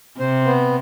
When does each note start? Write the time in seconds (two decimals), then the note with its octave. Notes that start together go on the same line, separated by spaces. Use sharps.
0.19 C3 C5
0.45 B3